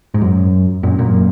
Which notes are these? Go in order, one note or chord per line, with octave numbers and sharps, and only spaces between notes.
G#2
F#2
F#2 A#2
F#2 A#2